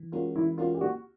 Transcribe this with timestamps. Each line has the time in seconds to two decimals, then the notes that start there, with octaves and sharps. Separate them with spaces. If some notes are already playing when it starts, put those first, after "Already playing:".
Already playing: E3
0.12 G#3 C#4 F4 F#4 A#4
0.35 E3 E4
0.58 G#3 C#4 F4 F#4 A#4
0.74 G4
0.81 A#3 F#4